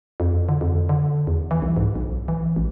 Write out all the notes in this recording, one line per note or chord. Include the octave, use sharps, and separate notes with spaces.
F2
D3
F2
D3
E2
E3
C2
G#2
B1
E3
A1